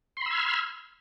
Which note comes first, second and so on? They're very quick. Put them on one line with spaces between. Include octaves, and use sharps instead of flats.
C6 B5 E6 G#6 F6